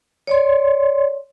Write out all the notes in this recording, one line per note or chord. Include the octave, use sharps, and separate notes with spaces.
C#5 D5 C6